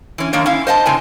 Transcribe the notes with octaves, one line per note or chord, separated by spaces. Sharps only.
E3 C#4
F#2 D#3 A#3 D4 C#5
C#4 E4 F5
C5 D#5 F5 A5
A2 C#3 C4 G#5